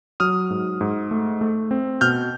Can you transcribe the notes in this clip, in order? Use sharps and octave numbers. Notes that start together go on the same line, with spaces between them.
F#3 D#6 F6
G#2
G#2
A3
A3
C4
B2 F6 G6